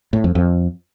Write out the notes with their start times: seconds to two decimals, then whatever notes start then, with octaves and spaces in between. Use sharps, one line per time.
0.13 A2
0.24 F2
0.35 F2